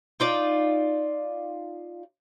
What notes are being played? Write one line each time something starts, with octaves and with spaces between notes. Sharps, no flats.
D#4 F4 D5